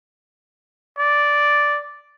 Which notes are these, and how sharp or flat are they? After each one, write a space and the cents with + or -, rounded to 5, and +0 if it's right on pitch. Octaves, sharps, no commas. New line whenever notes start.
D5 -5